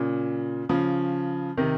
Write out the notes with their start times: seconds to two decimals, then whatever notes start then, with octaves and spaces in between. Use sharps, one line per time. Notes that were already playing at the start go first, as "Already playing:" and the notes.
Already playing: A#2 C#3
0.69 C#3 F3
1.57 C3 D#3